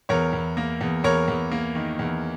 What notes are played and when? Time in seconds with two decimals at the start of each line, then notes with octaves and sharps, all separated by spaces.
0.09 E2 A#4 C#5
0.33 E2
0.57 A#3
0.81 E2
1.04 E2 A#4 C#5
1.28 E2
1.51 A#3
1.75 D#3
1.99 E2